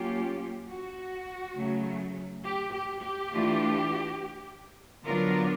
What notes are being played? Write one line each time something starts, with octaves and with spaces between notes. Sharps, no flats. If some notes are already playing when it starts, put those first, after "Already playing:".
Already playing: F#3 A#3 C#4 F4 G4
F#4
C#3 F#3 A3
G4
G4
G4
E3 A3 D4 F4
D3 F#3 B3 D4 F4 A#4